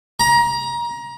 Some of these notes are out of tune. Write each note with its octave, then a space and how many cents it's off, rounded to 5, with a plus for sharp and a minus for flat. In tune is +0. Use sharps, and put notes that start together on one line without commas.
A#5 +25